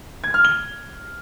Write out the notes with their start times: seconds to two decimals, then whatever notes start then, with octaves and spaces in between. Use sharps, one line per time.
0.24 G#6
0.34 F6
0.45 G7